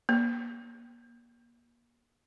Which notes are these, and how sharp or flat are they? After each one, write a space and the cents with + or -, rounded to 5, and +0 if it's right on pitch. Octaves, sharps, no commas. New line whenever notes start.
A#3 +30